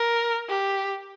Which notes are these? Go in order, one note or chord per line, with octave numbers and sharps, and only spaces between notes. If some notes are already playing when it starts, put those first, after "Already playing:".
Already playing: A#4
G4